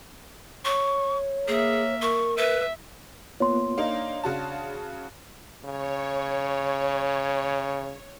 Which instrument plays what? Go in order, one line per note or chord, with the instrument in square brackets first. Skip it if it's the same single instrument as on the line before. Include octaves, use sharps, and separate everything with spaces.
[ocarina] C#5 [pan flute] C#6
[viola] A#3 E5 [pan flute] G#4
[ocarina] A#4 [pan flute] C#6
[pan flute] B4 [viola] E5
[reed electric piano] A#3 B3 F4 [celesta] C#5 C6
[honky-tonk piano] A#3 D#4 [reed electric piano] D4 D5 F5
[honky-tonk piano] C#3 F#4 A5
[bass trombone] C#3 [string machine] C#5